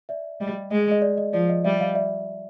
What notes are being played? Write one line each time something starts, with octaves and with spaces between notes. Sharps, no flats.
D5 E5
G3 D#5
G#3 D#5
D#5
D5
D#5
F3 D5
D#5
G3 D5 E5
D#5 F5
D5 E5